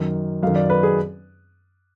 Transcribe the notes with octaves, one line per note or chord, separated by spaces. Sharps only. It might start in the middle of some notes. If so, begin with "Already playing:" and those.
Already playing: F#2 D#3
F#2 D#3 F5
D5
B4
G#4